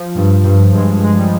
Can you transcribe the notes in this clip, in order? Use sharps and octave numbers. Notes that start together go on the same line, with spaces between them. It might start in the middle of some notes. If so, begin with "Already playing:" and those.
Already playing: F3
G2
G2
G2 G#3
G#3
G3